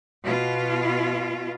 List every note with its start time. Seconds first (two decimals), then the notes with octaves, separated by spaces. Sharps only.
0.24 B2 F4